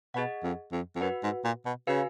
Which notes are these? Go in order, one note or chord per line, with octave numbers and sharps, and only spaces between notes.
B2 G#4 D#5 F#5
F2
F2
F2
F#2 F#4 B4 F#5
G#2
A#2
B2
C#3 F#4 B4 F5 G#5